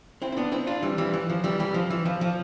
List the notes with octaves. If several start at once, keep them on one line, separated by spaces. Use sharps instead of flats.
C4 E4
E4
B3 D4
C4 E4
D4 F4
E3 G3
E3 G3
E3
F3
E3 G3
E3 G3
F3
E3
F3
F3